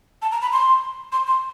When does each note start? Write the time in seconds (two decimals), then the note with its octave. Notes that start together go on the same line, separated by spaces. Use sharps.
0.22 A5
0.31 A#5
0.42 B5
0.52 C6
1.12 C6
1.27 C6